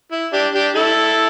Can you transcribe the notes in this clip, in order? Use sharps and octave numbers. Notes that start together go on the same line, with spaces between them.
E4
D4 G4
D4 G4
E4 A4